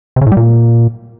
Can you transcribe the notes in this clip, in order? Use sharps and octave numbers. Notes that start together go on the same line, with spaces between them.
C3
C#3
A2
G3
A#2